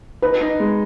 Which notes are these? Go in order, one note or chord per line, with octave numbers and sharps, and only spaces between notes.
D#4 B4
D#4
G#3